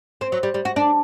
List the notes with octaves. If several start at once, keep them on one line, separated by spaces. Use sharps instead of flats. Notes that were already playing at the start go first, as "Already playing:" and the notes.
C4
F#3
G3
G3
F#4
D4